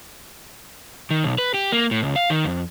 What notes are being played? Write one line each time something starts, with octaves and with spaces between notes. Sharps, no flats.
D#3
B1
B4
G4
A#3
A2
C#2
F5
D#3
F2